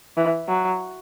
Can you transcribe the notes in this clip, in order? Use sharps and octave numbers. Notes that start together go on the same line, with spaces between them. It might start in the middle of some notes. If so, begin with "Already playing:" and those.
E3
F#3